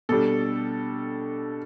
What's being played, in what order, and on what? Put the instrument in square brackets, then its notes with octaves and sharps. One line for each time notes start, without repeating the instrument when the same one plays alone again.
[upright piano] B2 G3 D4 A4